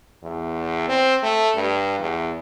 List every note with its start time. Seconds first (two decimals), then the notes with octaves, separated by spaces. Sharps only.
0.23 E2
0.88 C4
1.23 A3
1.55 G2
2.00 E2